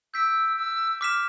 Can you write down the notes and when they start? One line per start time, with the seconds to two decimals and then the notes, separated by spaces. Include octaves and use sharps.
0.14 E6 G6 B6 D7
0.57 E6
1.01 D6 F6 B6 E7